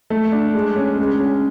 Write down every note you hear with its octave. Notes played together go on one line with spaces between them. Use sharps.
A3
D4
G#3
C#4
G#3
C#4